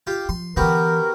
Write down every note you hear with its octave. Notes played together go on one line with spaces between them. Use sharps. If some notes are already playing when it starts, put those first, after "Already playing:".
F4 G4
F3 C6
D3 E3 B3 F#4 G4 A#4